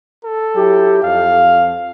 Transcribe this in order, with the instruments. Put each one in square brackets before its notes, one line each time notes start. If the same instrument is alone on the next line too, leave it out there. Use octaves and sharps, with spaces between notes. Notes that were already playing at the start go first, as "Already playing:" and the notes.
[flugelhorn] A4
[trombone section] F#3 E4 G4
[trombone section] F2 [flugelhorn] F5